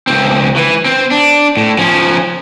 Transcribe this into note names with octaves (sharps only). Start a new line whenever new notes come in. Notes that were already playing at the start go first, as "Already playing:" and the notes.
C#2 C4
E3
C4
D4
A2
F3 C#4